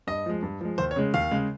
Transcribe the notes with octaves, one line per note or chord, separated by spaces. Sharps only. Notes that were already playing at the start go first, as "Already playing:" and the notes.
G2 D#5
F3 G#3
G2
F3 G#3
D#2 C5
C#5
C#3 G#3
D#2 F5
C#3 G#3